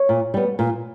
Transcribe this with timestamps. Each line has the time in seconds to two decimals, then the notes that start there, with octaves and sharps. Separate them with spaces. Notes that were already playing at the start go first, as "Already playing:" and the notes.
Already playing: C#5
0.09 A#2
0.34 G3 B3
0.59 A#2